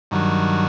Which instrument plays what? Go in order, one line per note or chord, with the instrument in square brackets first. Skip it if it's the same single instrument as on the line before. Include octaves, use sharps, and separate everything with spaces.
[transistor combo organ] G2 D#3 F#3